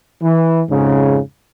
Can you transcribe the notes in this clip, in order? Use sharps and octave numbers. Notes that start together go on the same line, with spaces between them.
E3
F2 G#2 C#3